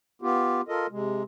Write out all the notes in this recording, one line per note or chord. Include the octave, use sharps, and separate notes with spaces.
B3 F4 G4
F4 A4 A#4 D#5
C3 G#3